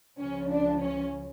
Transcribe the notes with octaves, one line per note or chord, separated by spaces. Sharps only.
C#2 C#3 F3 C#4
D4
C#4